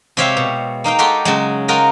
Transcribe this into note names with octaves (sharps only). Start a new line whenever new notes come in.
C3 G#3 G4 C#5 E5 F5
B2
A#3 D#4 F5 G5
G#3 F#4 G4 A4 G5 C6
C#3 F#3 G#3
F4 F#4 A#4 D#5 G5